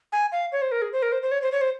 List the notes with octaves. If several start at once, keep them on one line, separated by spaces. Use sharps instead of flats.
G#5
F5
C#5
C5
A#4
G#4
C5
A#4
C5
C5
C#5
C5
C#5
C5